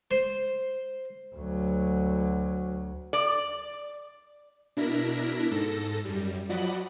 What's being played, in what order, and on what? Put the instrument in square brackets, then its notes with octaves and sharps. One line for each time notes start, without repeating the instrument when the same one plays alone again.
[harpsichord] C5
[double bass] D2 F#3
[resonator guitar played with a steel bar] D5
[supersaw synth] B2 D4 E4 A#4 A#6 B6
G#2 A4 A#6
F#2 G3
F3 F#3 D5 D#5 F#5 B5